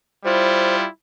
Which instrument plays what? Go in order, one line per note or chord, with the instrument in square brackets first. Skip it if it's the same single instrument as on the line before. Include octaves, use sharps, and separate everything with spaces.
[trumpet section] G3 E4 F4 [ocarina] C5